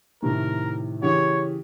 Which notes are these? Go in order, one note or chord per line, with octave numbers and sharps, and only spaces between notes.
A2 C3 D#3 A#4
C#3 E3 G4 C#5